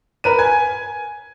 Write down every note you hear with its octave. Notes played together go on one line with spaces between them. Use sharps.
A#4 B4 D#7
G#5 G#6